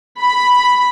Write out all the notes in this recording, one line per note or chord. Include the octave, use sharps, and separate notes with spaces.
B5